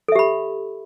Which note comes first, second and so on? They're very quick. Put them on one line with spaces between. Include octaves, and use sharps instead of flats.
A4 E5 G4 B5